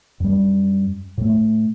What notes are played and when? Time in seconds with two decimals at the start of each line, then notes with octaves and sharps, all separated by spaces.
0.20 F#2 G3
1.18 A2 A3